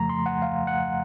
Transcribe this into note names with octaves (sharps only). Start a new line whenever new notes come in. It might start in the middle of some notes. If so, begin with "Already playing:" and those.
Already playing: F2 C#3 F3 A3 A#5
C6
F#5
F5
F#5